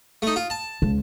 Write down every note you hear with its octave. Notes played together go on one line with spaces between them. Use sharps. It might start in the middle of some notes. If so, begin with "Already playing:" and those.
A3 D#4
F4
A5
C#2